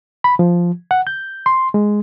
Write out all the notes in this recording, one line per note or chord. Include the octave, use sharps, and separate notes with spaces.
B5
F3
F#5
G6
C6
G#3